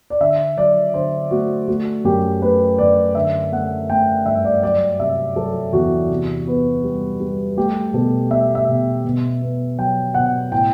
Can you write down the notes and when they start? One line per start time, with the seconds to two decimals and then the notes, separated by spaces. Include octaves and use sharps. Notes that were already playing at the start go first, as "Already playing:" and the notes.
0.10 D5
0.21 D3 E5
0.57 F#3 D5
0.94 D3 C5
1.31 A3 F#4
1.68 A3 F#4
2.04 F#2 G4
2.41 A3 B4
2.79 F#2 D5
3.15 D3 E5
3.52 A3 F#5
3.90 A3 G5
4.26 G2 E5
4.45 D5
4.63 F#3 D5
4.99 C3 E5
5.36 F#3 A4
5.73 E2 F#4
6.10 C3
6.47 B3
6.84 G3
7.20 G3
7.57 A3 G4
7.93 B2 A4
8.30 A3 E5
8.55 E5
8.68 B2
9.05 B2
9.41 B3
9.78 F#3 G5
10.14 B2 F#5
10.52 A2 G5